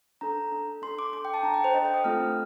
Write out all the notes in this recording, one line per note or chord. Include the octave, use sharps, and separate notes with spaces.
D4 A4 A#5
D4 A4
D4 A4 C6
D6
D4 A4 D6
G5
A5
D4 A4 A#5
G5
C5
D4 A4 D#5
G5
D#6
A3 C4 F4 A4 F6